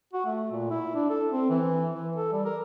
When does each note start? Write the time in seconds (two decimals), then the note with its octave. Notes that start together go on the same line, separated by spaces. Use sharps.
0.13 F#4
0.26 A3
0.52 A#2
0.71 E4
0.95 D4
1.09 A4
1.32 C4
1.50 E3
1.94 E3
2.16 A4
2.32 G3
2.45 A#4